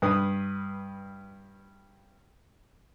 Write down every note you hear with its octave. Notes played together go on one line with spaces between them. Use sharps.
G2 B4 D#6